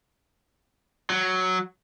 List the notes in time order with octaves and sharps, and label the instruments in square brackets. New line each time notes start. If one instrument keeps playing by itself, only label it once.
[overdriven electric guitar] F#3